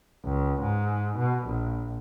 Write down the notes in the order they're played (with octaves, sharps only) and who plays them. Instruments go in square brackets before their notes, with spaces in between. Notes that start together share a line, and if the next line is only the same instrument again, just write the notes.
[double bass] C#2
G#2
B2
A#1